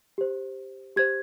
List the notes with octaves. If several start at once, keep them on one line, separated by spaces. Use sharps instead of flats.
G4 C5
G4 C5 G#6